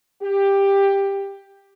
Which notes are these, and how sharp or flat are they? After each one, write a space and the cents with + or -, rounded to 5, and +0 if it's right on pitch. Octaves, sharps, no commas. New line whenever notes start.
G4 +10